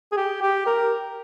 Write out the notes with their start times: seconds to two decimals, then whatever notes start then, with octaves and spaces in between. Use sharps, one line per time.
0.12 G#4
0.17 G4
0.42 G4
0.67 A#4